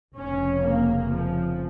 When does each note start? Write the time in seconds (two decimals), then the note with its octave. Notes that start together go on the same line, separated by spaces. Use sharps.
0.15 F1 F2 C#3 C#4
0.62 A#3
1.09 F3